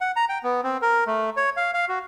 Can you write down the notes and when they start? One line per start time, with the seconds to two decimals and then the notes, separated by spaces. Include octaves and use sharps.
0.01 F#5
0.16 A#5
0.29 G5
0.43 B3
0.64 C4
0.82 A#4
1.07 A3
1.37 C#5
1.57 F5
1.74 F5
1.89 F#4